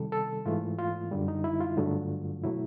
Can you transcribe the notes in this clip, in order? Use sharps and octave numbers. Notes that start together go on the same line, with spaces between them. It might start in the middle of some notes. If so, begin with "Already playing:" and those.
Already playing: C3 D#3 G3 A4
A4
G#2 E3 A3 F4
F4
F#2 D3 G3
D#4
E4
F4
G2 D3 F#3 A3
B2 F#3 A3 E4